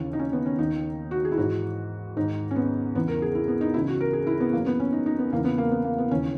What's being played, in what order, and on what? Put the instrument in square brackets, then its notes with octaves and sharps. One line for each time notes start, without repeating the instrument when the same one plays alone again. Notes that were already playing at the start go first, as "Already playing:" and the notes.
Already playing: [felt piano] D#2 C#3 E3
D#4
C#4
B3
C#4
D#2 D#3 D#4
F#4
G#4
E4
G#2 E3 F#4
G#2 D#3 D#4
C#4
B3
E2 C#3 E3 B3
A#4
G#4
E4
B3
D#4
C#2 C#3 E3 E4
F#4
A#4
G#4
E4
B3
F#2 E3 A#3
B3
C#4
D#4
D#4
B3
E2 C#3 E3 A#3
B3
A#3
B3
A#3
B3
D#2 C#3 E3 C#4